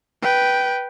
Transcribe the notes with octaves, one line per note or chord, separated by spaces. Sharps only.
B4 G5